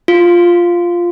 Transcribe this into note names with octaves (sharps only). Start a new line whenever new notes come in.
F4